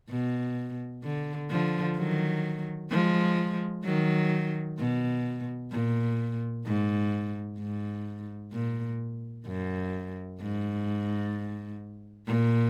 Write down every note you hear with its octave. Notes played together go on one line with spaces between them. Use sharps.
B2
D3
D3 F3
D#3 F#3
F3 G#3
D#3 F#3
B2
A#2
G#2
G#2
A#2
F#2
G#2
A#2